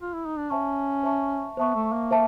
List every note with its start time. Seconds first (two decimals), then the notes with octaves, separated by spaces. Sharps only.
0.01 F4
0.13 E4
0.26 D#4
0.38 D4
0.50 C#4 C5 E5 A5 C#6
1.03 C5 E5 A5 C#6
1.57 B3 C5 E5 A5 C#6
1.75 A3
1.92 A#3
2.11 C5 E5 A5